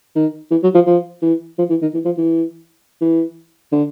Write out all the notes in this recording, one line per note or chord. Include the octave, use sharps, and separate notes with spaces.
D#3
E3
F#3
F3
F3
E3
F3
E3
D#3
E3
F3
E3
E3
D3